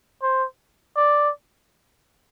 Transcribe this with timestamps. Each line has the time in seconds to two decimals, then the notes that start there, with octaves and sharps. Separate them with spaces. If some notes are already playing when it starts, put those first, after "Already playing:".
0.22 C5
0.96 D5